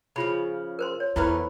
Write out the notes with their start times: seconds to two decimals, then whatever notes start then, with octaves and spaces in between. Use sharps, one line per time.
0.16 C#3 F3 F4 B5
0.79 A#4 C5 C6
1.00 C#5
1.16 E2 E3 A3 B3 E4 B4 C5